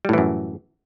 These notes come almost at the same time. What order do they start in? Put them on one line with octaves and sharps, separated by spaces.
G3 A2 E3 F#2